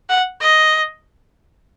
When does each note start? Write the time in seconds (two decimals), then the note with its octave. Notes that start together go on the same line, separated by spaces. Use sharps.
0.09 F#5
0.41 D#5